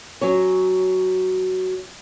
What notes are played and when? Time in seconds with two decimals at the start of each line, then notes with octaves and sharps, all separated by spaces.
0.21 F#3 C#4 C#5